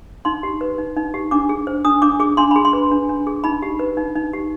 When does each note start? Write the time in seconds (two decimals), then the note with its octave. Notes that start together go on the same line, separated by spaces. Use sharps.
0.25 D#4 C6
0.43 G4
0.61 B4
0.78 D#4
0.97 D#4
1.14 G4
1.31 D4 D6
1.49 G#4
1.67 C5
1.85 D4 D#6
2.02 D4 D6
2.20 G#4 D6
2.37 D4 C6
2.51 G#4 B5
2.65 C6
2.73 B4
2.91 D4
3.09 D4
3.27 G#4
3.44 D#4 B5
3.62 G4
3.79 B4
3.97 D#4
4.16 D#4
4.33 G4